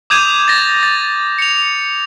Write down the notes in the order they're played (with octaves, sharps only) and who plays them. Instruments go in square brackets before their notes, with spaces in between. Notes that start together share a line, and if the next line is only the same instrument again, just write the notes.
[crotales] D6 D#6 G6 G#6 D#7 F7
A6 A#6
A6
C#7 F7